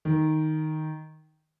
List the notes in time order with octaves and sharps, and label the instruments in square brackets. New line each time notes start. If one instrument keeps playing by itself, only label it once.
[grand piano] D#3